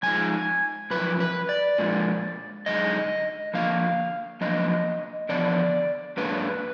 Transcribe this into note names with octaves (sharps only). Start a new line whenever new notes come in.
F2 F3 G#3 D#4 G#5
F#2 F3 B4
B4
D5
A#2 F3 G#3 D4
F#2 D3 G#3 D#4 D#5
D3 F3 A#3 D4 F5
F#2 F3 A#3 D4 D#5
D3 F3 B3 D4 D5
G#2 F#3 A#3 D4 B4